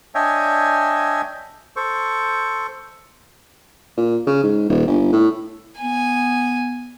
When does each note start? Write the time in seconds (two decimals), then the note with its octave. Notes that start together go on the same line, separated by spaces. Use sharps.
0.15 D4 C#5 D#5 E5 G5 G#5
1.76 A4 C5 C#6
3.97 A#2
4.27 C#3
4.43 G#2
4.69 D#1
4.87 G1
5.13 A2
5.81 B3 G#5